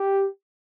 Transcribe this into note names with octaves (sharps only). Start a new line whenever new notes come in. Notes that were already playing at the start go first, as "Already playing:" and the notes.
Already playing: G4